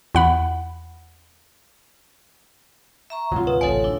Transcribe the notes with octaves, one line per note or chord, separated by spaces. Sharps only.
E2 F#5 B5
E5 A#5 C#6
D2 G#2 C3 F#3 F4
B4 D#6
A1 D2 C3 A3 A4 C#5 G#5
D4 E4